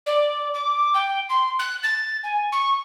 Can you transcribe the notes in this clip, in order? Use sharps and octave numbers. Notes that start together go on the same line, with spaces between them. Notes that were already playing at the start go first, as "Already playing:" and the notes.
D5
D6
G5
C6
F#6
A6
G#5
C#6